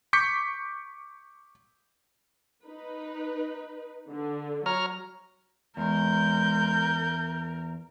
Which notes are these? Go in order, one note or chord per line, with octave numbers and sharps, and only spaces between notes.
C#6 D6 G6 B6 C#7
D#4 B4
D3
F#3 C#5 A#5 F6
E2 G#3 A#4 G6